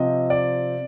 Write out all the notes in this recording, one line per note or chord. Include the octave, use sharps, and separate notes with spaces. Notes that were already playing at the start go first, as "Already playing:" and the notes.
Already playing: C3 F3 C4 D#5
D5